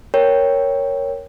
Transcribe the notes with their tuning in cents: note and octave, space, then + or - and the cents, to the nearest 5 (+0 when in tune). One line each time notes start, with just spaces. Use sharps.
A#4 +0 C#5 +0 G5 +0